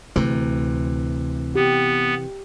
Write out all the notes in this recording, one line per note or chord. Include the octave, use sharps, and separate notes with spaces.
D2 C3 E3
B3 G4